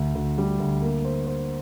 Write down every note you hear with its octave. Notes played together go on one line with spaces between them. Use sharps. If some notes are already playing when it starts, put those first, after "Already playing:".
Already playing: D2
D2
G3
D2
A#3
C5
C5